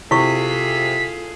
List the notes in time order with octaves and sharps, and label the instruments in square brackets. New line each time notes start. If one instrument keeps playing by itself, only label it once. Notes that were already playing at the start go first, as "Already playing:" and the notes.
[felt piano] C3 [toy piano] E4 C#6 [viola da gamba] F4 G#4 A4 [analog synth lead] B6